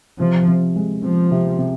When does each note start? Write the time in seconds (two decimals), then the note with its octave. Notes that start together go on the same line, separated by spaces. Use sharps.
0.20 C3 F3
0.48 C3
0.76 G#3
1.03 F3 C4
1.31 C3
1.59 C3